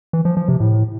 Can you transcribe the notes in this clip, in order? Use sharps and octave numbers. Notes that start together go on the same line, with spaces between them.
E3
F3
F3
C3
A2